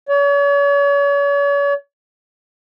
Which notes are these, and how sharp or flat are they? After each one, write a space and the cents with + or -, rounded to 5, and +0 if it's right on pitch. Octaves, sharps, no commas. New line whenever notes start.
C#5 +40